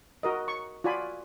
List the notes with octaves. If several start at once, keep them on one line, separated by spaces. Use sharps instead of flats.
F#4 A#4 D#5
C#6
F4 F#4 D5 G#5 B5